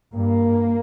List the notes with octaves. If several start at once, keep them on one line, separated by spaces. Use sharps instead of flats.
G2 A#3